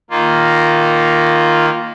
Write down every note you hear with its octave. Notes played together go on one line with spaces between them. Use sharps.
D#3 A#3 F4